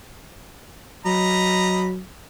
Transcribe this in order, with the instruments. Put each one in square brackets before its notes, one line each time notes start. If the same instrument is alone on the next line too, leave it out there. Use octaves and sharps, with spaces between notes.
[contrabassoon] F#3 [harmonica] D#5 A#5 B5